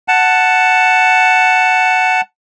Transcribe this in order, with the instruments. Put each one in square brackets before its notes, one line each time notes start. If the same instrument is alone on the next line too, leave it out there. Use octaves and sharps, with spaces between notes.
[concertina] F#5 A5